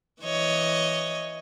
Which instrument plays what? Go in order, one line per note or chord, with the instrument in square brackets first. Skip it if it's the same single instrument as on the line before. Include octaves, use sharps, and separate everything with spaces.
[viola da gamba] E3 C#5 D#5